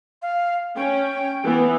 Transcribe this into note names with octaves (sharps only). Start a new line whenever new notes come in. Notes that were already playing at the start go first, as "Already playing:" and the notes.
F5
C#4 G5
E3 B3